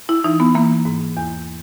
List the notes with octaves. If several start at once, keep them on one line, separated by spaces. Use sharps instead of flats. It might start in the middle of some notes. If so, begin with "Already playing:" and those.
E4
E3 D#4
B3
E3 A#3
G#2
E2